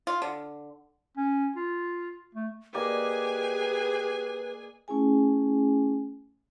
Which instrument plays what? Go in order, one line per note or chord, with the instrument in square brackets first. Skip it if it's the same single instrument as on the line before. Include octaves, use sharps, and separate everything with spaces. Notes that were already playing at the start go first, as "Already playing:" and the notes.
[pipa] F4
D3
[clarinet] C#4
F4
A3
[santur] A#3 D5 D#5 [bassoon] G4 [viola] G#4 G#5 [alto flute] B4
[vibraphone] A3 C#4 E4 G#4 G#5